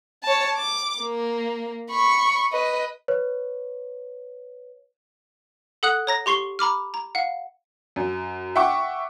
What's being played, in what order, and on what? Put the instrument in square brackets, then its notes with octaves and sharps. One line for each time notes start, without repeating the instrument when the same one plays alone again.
[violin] C#5 A5
D6
A#3
B5 C#6
B4 D#5
[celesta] B4 C#5
[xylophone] A4 F#5 D#6 F#6 F#7
C#5 A#5 A#6
G4 C6 C#6 C7 G7
A#5 B5 D6 F6
A#5
F5 F#5
[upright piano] F#2
E5 F#5 G5 C#6 D6